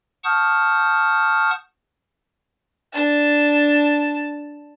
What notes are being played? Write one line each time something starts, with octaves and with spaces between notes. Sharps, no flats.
F#5 A5 C#6 D#6 F6 G6
D4 A5